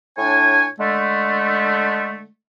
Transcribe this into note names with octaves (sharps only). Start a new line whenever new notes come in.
A2 D4 C#5 G#5
D3 G#3 A3